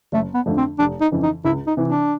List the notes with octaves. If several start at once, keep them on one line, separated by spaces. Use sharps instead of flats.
F#1 A3
B3
F2 D3 F3 A3
C4
F1 D4
D#4
F2 C#3 E3
D#4
C#2 E4
D#4
C3 E3
D4